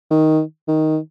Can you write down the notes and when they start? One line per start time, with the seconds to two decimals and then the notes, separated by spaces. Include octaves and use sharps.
0.11 D#3
0.68 D#3